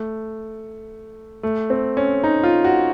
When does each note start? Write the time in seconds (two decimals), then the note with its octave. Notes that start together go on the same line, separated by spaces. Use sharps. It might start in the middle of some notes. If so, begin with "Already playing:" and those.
Already playing: A3
1.43 A3
1.70 C4
1.97 C#4
2.24 D#4
2.43 F4
2.64 F#4